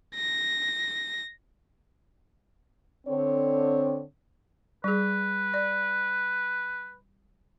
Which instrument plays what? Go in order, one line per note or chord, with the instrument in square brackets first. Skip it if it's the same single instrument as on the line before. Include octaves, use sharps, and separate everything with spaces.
[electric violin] A#6
[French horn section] D3 C4 C#5
[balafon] G3 G#4 [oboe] B4
[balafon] D5